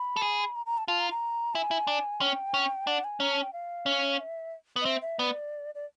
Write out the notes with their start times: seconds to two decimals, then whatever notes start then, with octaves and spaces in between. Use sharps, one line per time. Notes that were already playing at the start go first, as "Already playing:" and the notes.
Already playing: B5
0.16 A4
0.22 G#4
0.55 A#5
0.66 A#5
0.78 A5
0.88 F4 A5
1.00 A#5
1.11 A#5
1.54 E4 G#5
1.71 E4
1.87 D4
2.20 C#4 G5
2.54 C#4
2.87 D4 F#5
3.04 G#5
3.20 C#4 A#5
3.32 A5
3.42 G5
3.53 F5
3.86 C#4
4.20 E5
4.76 B3
4.81 D#5
4.85 C4 E5
5.02 E5
5.19 B3 D5
5.75 D5